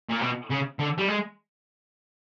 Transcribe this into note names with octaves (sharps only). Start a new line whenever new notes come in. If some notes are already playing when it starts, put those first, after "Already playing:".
A#2
B2
C#3
D3
G3
G#3